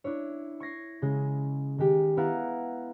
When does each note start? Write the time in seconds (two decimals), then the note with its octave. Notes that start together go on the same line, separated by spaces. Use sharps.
0.04 D4 E4 C#5
0.60 C#6 G#6 A#6 C7
1.02 C#3 G#3
1.78 D#3 G#3 G4
2.17 B3 E4 F5 F#5 A#5